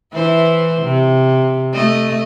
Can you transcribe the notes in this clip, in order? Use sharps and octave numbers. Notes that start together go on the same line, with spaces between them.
E3 E4 C5
C3
A3 D#5